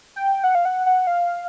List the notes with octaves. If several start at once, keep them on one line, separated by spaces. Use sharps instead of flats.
G5
F#5
F5
F#5
F#5
F5